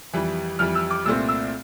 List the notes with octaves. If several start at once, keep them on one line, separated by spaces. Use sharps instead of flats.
F2 E3 G3
F2 E3 G3 F6
E6
D6
C2 A#2 A3 C4 E6
E6